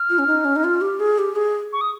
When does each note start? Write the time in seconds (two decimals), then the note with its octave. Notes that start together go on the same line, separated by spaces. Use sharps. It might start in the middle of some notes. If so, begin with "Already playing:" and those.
Already playing: F6
0.10 F4
0.19 C#4
0.27 D#4
0.45 C#4
0.56 D#4
0.64 F4
0.81 G4
1.00 G#4
1.18 G4
1.35 G#4
1.73 C#6
1.81 D#6